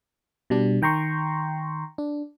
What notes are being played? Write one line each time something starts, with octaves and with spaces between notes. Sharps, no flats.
B2 G3 D4
D#3 G5 A#5 C6 C#6
D4